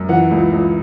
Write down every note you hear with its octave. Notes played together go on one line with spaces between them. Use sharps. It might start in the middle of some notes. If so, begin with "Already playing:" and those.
Already playing: F#2
E3 F#5
C#2
C#2